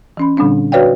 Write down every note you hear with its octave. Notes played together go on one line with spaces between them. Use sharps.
E3 C#4 B5
A#2 D3 G3 C4 D4
F#4 B4 C#5 D5 F5 G5